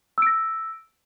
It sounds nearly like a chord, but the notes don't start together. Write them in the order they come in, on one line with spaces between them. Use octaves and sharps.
E6 D7 A#6